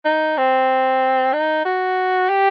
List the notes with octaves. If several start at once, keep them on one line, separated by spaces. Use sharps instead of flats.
D#4
C4
D#4
F#4
G4